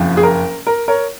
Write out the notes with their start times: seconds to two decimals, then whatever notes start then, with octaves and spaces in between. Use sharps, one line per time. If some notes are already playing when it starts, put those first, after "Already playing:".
Already playing: F#1 F2 F3
0.17 G#4
0.23 A#4
0.67 A#4
0.88 A#4 C#5